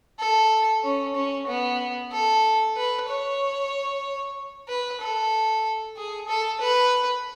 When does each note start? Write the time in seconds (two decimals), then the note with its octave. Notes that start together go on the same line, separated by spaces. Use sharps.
0.19 A4
0.84 C#4
1.15 C#4
1.47 B3
2.12 A4
2.76 B4
3.08 C#5
4.68 B4
5.01 A4
5.97 G#4
6.28 A4
6.60 B4